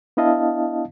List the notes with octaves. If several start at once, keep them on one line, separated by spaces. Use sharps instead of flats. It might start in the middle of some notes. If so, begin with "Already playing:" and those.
B3 D4 E4 D#5 F5 A5